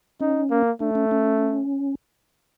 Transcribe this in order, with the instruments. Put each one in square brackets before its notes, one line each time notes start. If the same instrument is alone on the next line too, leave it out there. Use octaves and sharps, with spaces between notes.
[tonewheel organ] C#4 [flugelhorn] D#4
[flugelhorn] A#3
[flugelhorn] A3 [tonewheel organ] D4
[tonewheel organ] C#4
C#4